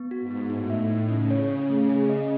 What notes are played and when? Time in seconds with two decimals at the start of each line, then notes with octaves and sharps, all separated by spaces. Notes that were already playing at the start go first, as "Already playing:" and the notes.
Already playing: B3
0.11 F#4
0.20 G#2
0.31 B3
0.50 A2 D#4
0.70 E5
0.80 A2
0.90 D#4
1.10 C#3 C#4
1.31 C#5
1.50 C#4
1.69 A3
1.89 G#4
2.09 D#5